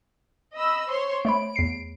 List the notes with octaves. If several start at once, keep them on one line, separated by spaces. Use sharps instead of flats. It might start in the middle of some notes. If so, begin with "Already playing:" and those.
D#5 B5 E6
C5 C#5 C6
A3 C#5 B5 D7
E2 C7